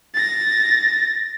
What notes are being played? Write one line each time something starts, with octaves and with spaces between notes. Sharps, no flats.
A6 A#6